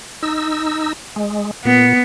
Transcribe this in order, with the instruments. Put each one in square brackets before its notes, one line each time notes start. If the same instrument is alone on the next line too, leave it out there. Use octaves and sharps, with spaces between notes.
[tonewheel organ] D#4 E6
G#3
[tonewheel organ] A#2 [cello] B3